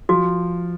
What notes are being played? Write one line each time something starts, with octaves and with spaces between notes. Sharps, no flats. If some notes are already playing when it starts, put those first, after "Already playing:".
F3 F#4